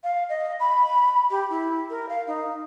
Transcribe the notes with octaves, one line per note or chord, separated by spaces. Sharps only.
F5
D#5
B5
G4
E4
A#4
F5
D#4